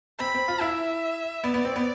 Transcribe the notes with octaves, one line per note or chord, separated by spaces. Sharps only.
C4 B5
C4
F4
E4 E5
B3 D5
B3
C4
B3